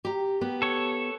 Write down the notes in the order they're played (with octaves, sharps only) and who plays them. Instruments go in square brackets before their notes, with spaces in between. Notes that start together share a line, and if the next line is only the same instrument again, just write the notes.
[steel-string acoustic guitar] G4 A#5
B3 G4
[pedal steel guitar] A4 C#5